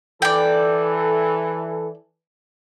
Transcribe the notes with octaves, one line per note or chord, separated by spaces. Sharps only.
E3 A4 D5 G5